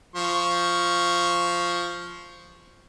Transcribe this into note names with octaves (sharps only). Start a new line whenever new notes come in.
F3 C#6